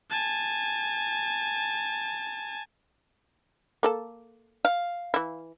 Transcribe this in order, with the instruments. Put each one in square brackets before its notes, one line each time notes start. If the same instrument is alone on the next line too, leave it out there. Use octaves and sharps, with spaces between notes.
[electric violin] G#5 A5
[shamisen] A#3 A4 A5
[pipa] F5
[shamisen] E3 E4